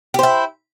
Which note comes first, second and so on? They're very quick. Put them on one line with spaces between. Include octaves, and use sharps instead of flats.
G4 C5 E4